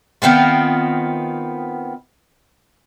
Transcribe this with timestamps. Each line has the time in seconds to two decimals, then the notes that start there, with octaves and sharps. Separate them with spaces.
0.22 D#3 B3 C4 F4